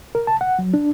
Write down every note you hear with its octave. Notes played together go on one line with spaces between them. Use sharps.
A#4
A5
F#5
F#3
D4